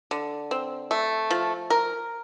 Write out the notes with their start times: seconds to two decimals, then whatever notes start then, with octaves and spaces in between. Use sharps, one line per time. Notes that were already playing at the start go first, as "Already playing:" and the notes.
0.11 D3
0.51 C4
0.91 A3
1.31 F3
1.70 A#4